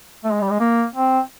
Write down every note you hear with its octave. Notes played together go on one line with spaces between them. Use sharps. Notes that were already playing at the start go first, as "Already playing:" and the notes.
A3
G#3
G3
G#3
A#3
C4